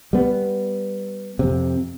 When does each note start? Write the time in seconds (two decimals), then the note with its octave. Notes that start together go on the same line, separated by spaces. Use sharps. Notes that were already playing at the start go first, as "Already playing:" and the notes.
0.13 G3 B3
1.39 F2 C3